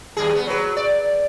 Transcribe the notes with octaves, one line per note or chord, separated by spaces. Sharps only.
D#2 G3 G#4
B3
F#3 B4
D5